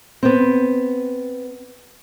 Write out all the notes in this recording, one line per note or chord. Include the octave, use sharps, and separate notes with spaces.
B3 C4